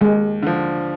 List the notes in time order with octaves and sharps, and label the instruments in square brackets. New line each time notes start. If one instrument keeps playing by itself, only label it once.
[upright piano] D#2 [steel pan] G#3
[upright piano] D3 F3